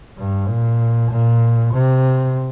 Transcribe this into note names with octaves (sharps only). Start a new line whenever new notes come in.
G2
A#2
A#2
C3